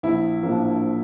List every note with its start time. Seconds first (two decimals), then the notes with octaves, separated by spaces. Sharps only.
0.03 A#1 E4
0.43 A2 F3 A#3 D4